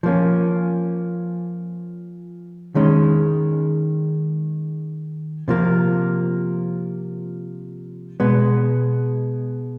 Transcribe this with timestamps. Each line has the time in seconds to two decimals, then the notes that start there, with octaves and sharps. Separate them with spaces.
0.03 F3 A#3 C#4
2.75 D#3 G#3 C#4
5.48 C3 F3 A#3
8.20 B2 G#3 B3